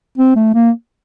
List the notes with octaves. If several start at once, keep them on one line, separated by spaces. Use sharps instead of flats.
C4
A3
A#3